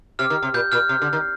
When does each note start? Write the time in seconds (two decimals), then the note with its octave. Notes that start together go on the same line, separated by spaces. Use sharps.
0.19 C3 F6
0.30 D#3
0.43 C3
0.54 A#2 G6
0.72 A#2 F6
0.89 C3
1.02 D3
1.13 D#3